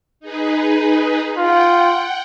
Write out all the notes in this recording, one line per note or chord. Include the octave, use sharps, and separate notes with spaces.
D#4 G#4 B4
F4 F#5 G5